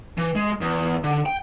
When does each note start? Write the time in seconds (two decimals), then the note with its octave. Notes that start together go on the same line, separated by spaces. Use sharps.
0.18 E3
0.36 G#3
0.61 E2
1.04 D3
1.26 G5